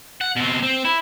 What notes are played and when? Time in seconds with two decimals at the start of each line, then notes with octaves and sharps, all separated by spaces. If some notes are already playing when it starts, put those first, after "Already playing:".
0.21 F#5
0.36 B2 C4
0.63 C4
0.85 E4